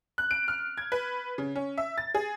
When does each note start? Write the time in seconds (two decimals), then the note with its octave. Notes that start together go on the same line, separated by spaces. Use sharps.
0.18 F#6
0.31 D7
0.48 F6
0.78 G#6
0.92 B4
1.38 C#3
1.56 C#4
1.78 E5
1.98 A6
2.15 G#4